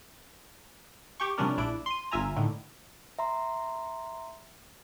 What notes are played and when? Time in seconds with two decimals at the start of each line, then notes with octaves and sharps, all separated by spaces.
1.20 G4 G5 C#6
1.38 C3 F3 G3 C#4 D4 A#4
1.57 A#1 D4 E4 D7
1.86 C6 D#7
2.11 G1 F4 E5 G#5 A#5
2.36 A2 D3 D#3
3.19 E5 A#5 C6